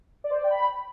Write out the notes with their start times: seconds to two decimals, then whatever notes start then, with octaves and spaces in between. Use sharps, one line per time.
0.24 D5
0.31 C5
0.37 D5
0.44 G5
0.50 B5